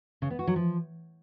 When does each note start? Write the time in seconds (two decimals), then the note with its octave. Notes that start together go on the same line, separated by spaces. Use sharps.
0.22 C#3
0.30 B3
0.39 F#4
0.47 F#3
0.56 F3